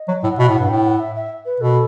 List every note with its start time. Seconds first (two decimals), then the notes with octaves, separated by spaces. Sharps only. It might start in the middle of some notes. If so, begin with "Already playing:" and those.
Already playing: D#5
0.08 F#3
0.24 A2
0.30 F#5
0.38 B2 E5
0.49 A2
0.54 G2 F#5
0.69 A2 G5
0.85 F#5
1.00 E5
1.15 E5
1.45 B4
1.60 B2 A4